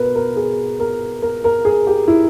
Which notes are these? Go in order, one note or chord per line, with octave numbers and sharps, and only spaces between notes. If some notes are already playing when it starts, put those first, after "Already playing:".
Already playing: B2 A#4 B4
A#4
G#4
A#4
A#4
A#4
G#4
G4
E4